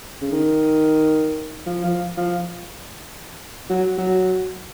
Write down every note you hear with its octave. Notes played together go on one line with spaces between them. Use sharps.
C#3
D#3
F3
F3
F3
F#3
F#3